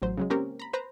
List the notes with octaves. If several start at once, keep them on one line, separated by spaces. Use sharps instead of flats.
A1 F#3 C5
C#3 F#3 G#3
A#3 C4 C#4 G4 A#4
A#5 B5
B4 C5 A#5